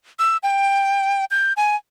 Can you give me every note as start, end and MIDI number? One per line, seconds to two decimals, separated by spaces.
0.19 0.37 88
0.43 1.25 79
1.31 1.53 91
1.57 1.76 80